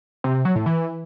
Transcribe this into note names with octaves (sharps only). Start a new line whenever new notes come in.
C3
C3
F#3
A2
E3